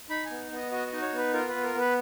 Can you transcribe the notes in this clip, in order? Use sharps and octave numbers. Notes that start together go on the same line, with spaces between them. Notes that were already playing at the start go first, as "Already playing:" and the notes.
D#4 B5
G#5
B3
B3
D#5
F#4 D#5
D#5
D#4
C#5
B3 B4
F4 A#4
B3 B4
A#4
B3 B4